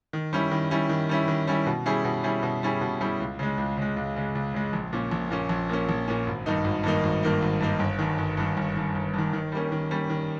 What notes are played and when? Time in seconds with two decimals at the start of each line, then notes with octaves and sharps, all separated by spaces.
0.13 D#3
0.33 G3 C#4 E4
0.51 D#3
0.71 G3 C#4 E4
0.89 D#3
1.09 G3 C#4 E4
1.28 D#3
1.47 G3 C#4 E4
1.66 B2
1.86 G3 C#4 E4 G#4
2.04 B2
2.24 G3 C#4 E4 G#4
2.43 B2
2.63 G3 C#4 E4 G#4
2.81 B2
3.00 G3 C#4 E4 G#4
3.20 C#2
3.39 C#3 G#3
3.58 C#2
3.77 C#3 G#3
3.96 C#2
4.16 C#3 G#3
4.35 C#2
4.54 C#3 G#3
4.73 A#1
4.93 A#2 A#3 C#4
5.11 A#1
5.31 A#2 A#3 C#4
5.49 A#1
5.69 A#2 A#3 C#4
5.89 A#1
6.08 A#2 A#3 C#4
6.26 G#1
6.46 G2 D#3 A#3 D#4
6.64 G#1
6.83 G2 D#3 A#3 D#4
7.03 G#1
7.23 G2 D#3 A#3 D#4
7.42 G#1
7.60 G2 D#3 A#3 D#4
7.79 G1
7.99 G2 D#3
8.18 G1
8.37 G2 D#3
8.57 G1
8.76 G2 D#3
8.95 G1
9.14 G2 D#3
9.33 D#3
9.52 G3 A#3 C#4
9.72 D#3
9.91 G3 A#3 C#4
10.10 D#3